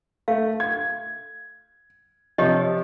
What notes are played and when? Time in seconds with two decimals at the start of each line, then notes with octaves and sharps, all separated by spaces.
0.28 A3 F5
0.60 G#6
2.38 C3 F3 G4 C#5 D#5